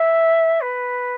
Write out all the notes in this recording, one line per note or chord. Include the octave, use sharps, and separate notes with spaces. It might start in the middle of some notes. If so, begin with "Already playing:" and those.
Already playing: E5
B4